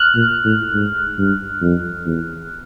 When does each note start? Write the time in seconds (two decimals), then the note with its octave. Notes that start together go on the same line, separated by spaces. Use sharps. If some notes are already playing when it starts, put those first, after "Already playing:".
Already playing: F6 F#6
0.15 A#2
0.44 A2
0.74 G#2
1.18 G2
1.61 F2
2.05 E2